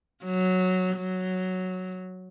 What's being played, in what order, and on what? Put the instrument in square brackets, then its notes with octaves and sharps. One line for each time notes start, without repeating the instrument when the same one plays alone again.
[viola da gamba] F#3
F#3